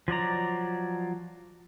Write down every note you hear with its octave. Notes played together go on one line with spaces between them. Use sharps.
F3 F#3 D5 A#5